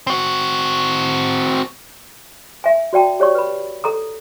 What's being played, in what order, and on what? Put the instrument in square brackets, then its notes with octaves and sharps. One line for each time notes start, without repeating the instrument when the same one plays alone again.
[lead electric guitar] C4 F#4
[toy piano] E5 G#5
F#4 D5 G5 A5
G4 C#5 D5 C#6
B4 B5
A4 A#5 D#6